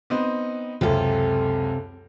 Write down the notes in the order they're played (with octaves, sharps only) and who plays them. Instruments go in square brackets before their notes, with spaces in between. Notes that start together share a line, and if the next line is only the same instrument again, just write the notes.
[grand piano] B3 C4 D#4
[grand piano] C#2 F#2 [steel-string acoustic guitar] C3 A4